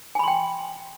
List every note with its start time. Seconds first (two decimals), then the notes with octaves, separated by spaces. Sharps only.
0.15 G#5
0.19 B5
0.23 C6
0.28 G5